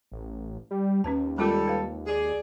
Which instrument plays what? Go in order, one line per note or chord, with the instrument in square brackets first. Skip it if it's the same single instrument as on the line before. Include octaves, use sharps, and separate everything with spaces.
[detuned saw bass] A1
G3
[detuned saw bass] D#2 [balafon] C#4 B4 A5
[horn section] G3 A4 [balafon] G#3 F4 A#4
[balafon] B4 F5
[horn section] G#4 D5